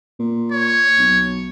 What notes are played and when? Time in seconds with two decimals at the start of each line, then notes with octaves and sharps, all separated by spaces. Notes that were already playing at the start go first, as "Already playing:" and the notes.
0.19 A#2
0.52 C#5
0.99 B1